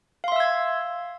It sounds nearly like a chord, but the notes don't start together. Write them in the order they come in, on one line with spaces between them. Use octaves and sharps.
F5 C6 E5 E6 G#6